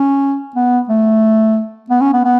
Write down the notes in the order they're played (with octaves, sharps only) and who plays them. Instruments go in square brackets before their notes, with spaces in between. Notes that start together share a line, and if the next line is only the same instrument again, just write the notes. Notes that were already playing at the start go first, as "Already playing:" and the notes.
Already playing: [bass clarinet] C#4
B3
A3
B3
C#4
B3
B3